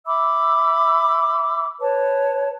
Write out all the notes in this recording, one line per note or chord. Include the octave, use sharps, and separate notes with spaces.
E5 B5 D6 E6
B4 C#5 A5